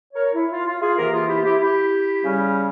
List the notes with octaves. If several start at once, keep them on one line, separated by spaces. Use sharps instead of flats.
A#4 C#5
E4
F4
F4
F4 G#4
C3 E3 A#3 G4 A#4
F4 G#4
E4 G4
E4 G4
E4 G4
C#3 G3 C#4